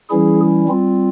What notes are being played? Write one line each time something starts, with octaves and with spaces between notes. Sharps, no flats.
E3 G3 C#4 E4 G#4
G3 C4 F4